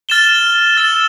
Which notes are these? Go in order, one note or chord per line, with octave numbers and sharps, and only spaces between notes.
F6 A6 E7 G7
E6 A6 E7